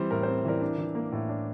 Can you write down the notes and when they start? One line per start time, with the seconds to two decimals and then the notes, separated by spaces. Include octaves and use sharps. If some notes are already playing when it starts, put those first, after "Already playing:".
Already playing: E3 G3 C4 C5
0.11 A2 A#4
0.23 C5
0.28 C4
0.45 E3 A#4 D5
0.61 D4
0.78 E3
0.95 A#3
1.12 A2
1.29 D4